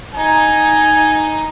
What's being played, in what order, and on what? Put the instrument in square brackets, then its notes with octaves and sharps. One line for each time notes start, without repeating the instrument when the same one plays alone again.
[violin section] D#4 [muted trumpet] G#5